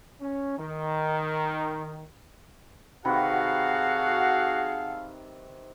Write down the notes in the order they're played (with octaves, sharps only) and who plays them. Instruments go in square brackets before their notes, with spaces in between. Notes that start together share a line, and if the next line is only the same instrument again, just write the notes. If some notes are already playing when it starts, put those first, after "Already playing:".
[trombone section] C#4
D#3
[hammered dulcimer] C3 D#3 B4 [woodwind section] F#4 F#5 [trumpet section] G#4 A4 F5